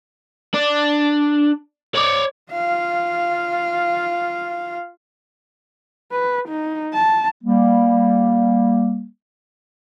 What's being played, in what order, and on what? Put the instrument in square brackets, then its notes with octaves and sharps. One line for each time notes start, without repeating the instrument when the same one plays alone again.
[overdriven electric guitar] D4
C#5 D5
[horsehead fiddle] F4 F5
B4
D#4
A5
[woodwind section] G3 A#3